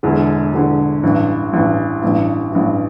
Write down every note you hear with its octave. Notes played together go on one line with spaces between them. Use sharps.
E1 E2 D3
E1 E2 D3
A1 G2 E3
A1 G2 E3
A1 G2 E3
A1 G2 E3